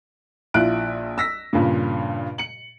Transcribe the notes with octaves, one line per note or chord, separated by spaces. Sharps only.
A#1 E4 F4 F#6 D7
E6 A#6 B6
G2 A#2 C#3
C#7 F#7